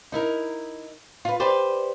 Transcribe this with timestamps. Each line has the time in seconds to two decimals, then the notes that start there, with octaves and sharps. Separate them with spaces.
0.12 D#4 E4 A#4
1.25 F4 B4
1.40 G4 B4 C5 D5